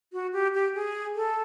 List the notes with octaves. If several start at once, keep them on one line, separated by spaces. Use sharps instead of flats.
F#4
G4
G4
G#4
A4